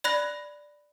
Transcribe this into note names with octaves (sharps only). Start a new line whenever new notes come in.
D5 B5 F#6 A#6